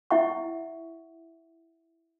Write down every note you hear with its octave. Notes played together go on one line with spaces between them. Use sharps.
E4 E5 F#5 C#6